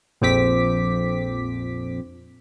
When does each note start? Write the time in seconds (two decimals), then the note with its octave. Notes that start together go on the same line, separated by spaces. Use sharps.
0.21 A#1 F2 C4 D6 B6